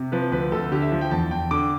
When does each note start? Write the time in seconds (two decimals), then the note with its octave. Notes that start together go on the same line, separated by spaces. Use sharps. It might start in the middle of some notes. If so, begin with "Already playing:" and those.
Already playing: C3
0.12 F3 B4
0.31 D2 B4
0.52 D2 A4
0.71 D3 G4
0.82 E5
0.92 F3
1.01 G5
1.11 E2 A5
1.31 E2 G5
1.51 D3 D6